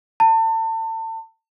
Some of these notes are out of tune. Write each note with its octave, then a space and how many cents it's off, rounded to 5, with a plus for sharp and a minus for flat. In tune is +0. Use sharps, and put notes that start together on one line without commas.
A5 +35